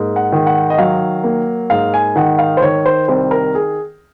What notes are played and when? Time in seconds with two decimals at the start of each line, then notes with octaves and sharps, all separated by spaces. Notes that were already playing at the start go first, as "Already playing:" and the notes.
Already playing: G#2 A#3
0.16 F#5
0.32 D#3
0.47 F#5
0.70 D#5
0.78 F#3 F5
1.24 A#3
1.70 G#2 F5
1.94 G#5
2.16 D#3 F#5
2.39 F5
2.57 C5
2.62 D#3 C#5
2.86 C5
3.08 C2 C5
3.31 A#4
3.55 G#4